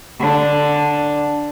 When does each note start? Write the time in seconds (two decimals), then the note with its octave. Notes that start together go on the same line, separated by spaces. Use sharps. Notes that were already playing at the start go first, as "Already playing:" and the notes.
0.19 D3 D4